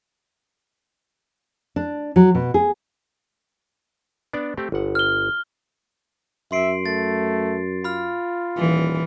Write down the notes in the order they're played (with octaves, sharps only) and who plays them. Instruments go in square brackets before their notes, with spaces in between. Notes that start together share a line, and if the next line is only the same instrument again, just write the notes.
[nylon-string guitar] D4
F#3
B2
G#4
[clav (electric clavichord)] B3 D4 D5
A3 C4 G4
G1 F#5
[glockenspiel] F6 G7
[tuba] F#2 [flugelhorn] E5 [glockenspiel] C6 C7 D7
[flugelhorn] A3 [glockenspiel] A6
[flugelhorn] F4 [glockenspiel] B5 F6
[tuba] D#1 [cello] E3